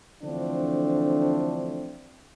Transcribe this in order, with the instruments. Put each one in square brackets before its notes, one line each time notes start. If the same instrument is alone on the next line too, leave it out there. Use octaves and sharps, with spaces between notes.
[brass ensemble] D3 E3 F3 A3 C4 D4